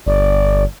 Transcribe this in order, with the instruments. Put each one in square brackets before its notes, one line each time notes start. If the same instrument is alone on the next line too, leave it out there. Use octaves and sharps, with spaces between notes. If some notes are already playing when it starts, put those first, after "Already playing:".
[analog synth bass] G1 [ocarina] D5